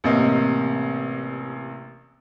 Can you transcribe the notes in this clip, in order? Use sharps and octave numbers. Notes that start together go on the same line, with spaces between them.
A1 C3 A#3 D#5